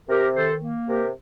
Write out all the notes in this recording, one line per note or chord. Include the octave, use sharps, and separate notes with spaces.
C3 G4 A#4
D#3 A4 C5
A#3
C3 G4 A#4